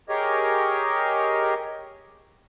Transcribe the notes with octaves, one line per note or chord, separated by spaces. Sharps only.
G4 G#4 A#4 C#5 D#5